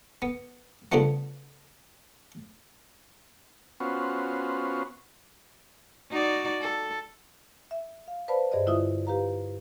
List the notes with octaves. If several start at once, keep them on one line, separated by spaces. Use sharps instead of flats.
B3
C#2 D3 F3 G3 A3 B3
B3 C#4 F4 F#4 C5
D#4 F#4 D5
A4
E5
F5
B4 C5 D5 F5 A5 B5
G2 G#4 C5 D5 D#5
D3 G#3 E4 F4 E5 D#6
G4 B4 F5 A#5